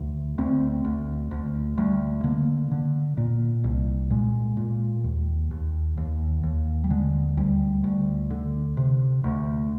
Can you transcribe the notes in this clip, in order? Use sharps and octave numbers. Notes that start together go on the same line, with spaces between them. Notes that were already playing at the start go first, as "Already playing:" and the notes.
Already playing: D2
D2 C4
D2
D2
D2 G3
D3 A#3
D3
A#2
C2
A#2 G#3
A#2
D#2
D#2
D#2
D#2
G3
D3 G#3
D2 G3
D2
D3
C3
D2